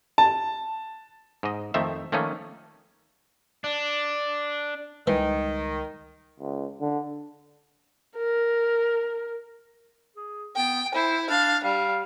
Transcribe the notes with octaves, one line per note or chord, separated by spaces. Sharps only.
A5
G#2 D#5
F2 D#3 A3 C5 E5
D#3 F3 A3 A#3 C#4 D#4
D4
C#2 D#3 E3 G3 G#3
C#2
D3
A#4
G#4
B3 G5
E4 C5
D4 F5
G3 F5